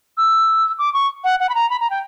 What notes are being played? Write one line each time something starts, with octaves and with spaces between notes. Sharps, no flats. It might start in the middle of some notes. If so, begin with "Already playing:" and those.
E6
D6
C#6
F#5
F#5
B5
A#5
B5
A#5
G5